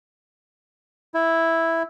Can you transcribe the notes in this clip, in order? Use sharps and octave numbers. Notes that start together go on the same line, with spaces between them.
E4